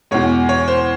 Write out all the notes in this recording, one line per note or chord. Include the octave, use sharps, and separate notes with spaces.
E2 B2 G#3 C#5
C#5
C5